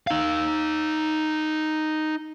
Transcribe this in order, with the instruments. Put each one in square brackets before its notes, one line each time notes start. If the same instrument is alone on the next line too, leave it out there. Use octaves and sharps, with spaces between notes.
[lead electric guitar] D#4 F5